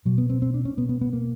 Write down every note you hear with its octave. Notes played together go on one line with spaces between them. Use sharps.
B2 F#3
B3
C4
C4
D4
C#4
B2 B3
B3
B3
A#3